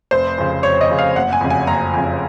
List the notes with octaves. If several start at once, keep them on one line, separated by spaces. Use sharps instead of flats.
F1 C5
F2 C#3
F1 C#5
D#5
F2 C#3
F5
F#1 F#5
G#5
F2 C#3
G#5
F#1 A#5
F2 C#3